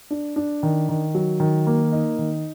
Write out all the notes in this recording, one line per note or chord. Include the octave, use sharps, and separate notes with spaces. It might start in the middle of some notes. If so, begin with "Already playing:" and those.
D4
D4
D#3
D#3
F#3
D#3
A#3
D#4
D#3